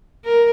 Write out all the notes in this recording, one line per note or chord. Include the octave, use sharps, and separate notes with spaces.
A#4